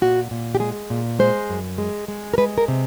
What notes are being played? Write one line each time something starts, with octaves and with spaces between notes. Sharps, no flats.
A#2 F#4
A#2
G4
G#3 G#4
A#2
G#3 C5
F#2
G#3
G#3
A#4
G#3 B4
A#4
C3